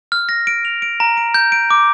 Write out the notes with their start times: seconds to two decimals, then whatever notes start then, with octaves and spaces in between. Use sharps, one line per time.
0.12 F6
0.29 A#6
0.47 D7
0.65 F7
0.82 D7
1.00 A#5
1.17 D7
1.34 G6
1.52 D7
1.71 D6